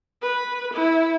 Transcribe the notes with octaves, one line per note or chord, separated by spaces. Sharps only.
B4
E4